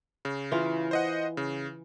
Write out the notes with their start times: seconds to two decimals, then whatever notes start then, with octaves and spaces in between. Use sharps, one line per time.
0.25 C#3
0.52 E3 F4
0.91 C5 D#5 F#5
1.37 C#3